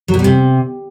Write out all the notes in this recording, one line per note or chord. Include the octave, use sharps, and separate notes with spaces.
F#3
B2
G3
C3